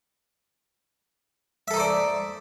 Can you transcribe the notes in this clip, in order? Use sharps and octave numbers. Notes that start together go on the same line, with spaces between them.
D#4 A4 C5 D5 E5